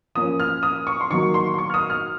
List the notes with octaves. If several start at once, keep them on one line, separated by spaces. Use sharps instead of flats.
F3 A#3 C#4 D#6
F6
D#6
C#6
C6
D#3 F#3 A#3 C#6
C6
C6
C#6
F6
D#6
F6